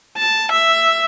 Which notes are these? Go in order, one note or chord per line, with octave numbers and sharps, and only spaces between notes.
A5
E5